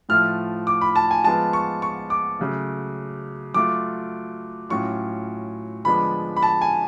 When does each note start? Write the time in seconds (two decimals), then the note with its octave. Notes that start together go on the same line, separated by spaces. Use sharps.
0.09 A2 F3 A3 F4 F6
0.67 D6
0.81 B5
0.96 A5
1.11 G#5
1.24 F3 G#3 B3 F4 A5
1.53 C#6
1.82 C#6
2.10 D6
2.39 C#3 F#3 A3
3.54 F#3 A3 F4 D6
4.69 A2 F#3 C#4 F4 C#6
5.85 D3 F3 G#3 B3 D4 B5
6.37 B5
6.42 A5
6.61 G#5